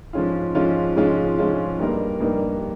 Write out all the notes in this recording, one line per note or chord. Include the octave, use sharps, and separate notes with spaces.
G#2 F3 G#3 C#4 F4
G#2 F3 G#3 C#4 F4
G#2 F3 G#3 C#4 F4
G#2 F3 G#3 C#4 F4
G2 G3 A#3 D#4 A#4
G2 G3 A#3 D#4 A#4